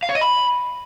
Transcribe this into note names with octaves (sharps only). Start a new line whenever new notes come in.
F5
C#5
D#5
B5